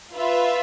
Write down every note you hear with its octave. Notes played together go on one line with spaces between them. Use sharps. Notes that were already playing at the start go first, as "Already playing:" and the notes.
F4 B4 E5